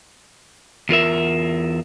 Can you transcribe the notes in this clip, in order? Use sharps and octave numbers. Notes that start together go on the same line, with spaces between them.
E2 F4 A#4 E5